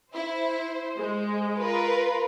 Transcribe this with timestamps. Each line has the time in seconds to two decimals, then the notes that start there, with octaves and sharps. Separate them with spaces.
0.13 E4 C5
0.98 G#3
1.57 F4 A#4 B4